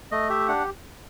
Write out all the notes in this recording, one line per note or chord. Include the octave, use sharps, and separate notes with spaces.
A3 D#5
G4 E5
D4 F#5